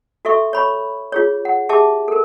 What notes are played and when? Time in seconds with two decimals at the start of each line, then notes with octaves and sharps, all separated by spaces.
0.25 F#4 A4 E5 C#6
0.53 C#5 B5 C#6
1.12 F4 G#4 C#5
1.45 F#5
1.69 G4 G#4 E5 A5 D6
2.08 A4 A#4